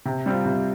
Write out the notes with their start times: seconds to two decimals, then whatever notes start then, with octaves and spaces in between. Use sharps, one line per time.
0.06 C3
0.26 G3 C4 F4
0.46 C3